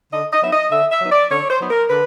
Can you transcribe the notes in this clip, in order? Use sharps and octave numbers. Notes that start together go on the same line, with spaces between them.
D3 D#5
D#5
F#3 B3 D#4 E5
D#5
D3 E5
E5
F#3 B3 D#4
D5
D3 C#5
C5
F#3 B3 D#4
A#4
D3 B4